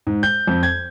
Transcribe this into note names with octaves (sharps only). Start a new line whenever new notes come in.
G#2
G6
F2
G#6